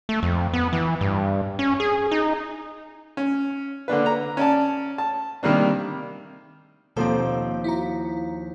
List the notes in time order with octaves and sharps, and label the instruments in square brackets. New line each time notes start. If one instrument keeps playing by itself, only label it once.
[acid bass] A3
F2
B3
E3
G2
C#4
G#4
D#4
[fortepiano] C#4
D3 A#3 D4 B4
A#5
C#4 D5 A5
A5
C3 D#3 G3 A#3 D4
[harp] D#2 F3 C4 [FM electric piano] B2 A4 C5
[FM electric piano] E4 F#4 A#5